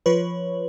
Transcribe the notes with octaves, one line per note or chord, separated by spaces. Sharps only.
F3 B4 C#5